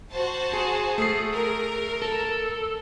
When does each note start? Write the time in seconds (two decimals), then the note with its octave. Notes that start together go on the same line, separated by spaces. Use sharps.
0.11 F#4 C5 A5
0.54 G#4
0.98 A3 C7
1.33 A#4
2.02 A4